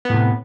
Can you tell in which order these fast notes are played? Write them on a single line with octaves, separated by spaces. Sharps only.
B3 A2 C3